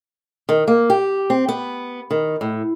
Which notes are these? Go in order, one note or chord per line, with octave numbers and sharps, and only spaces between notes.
D#3
A#3
G4
C4
B3
D#3
A2